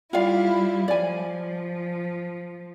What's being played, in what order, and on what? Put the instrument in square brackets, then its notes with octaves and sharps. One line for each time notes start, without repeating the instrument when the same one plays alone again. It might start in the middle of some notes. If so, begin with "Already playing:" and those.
[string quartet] G3 E4 [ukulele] F4 D5 F5
[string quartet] F3 [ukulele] D5 G#5